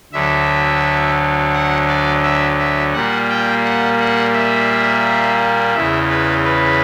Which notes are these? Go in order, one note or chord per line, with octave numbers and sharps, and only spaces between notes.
D2 D3 F#3 E5
F#5
D5
E5
E5
A#2 G3 A#3 F#5
G5
F#5
F#5
E5
E2 C#3 E3 E5
B4
B4